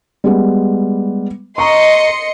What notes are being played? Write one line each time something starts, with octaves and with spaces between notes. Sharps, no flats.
G3 G#3 B3
D#5 A#5 C6 C#6 C#7